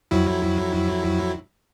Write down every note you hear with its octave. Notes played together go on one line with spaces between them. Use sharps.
F2 F#3 E4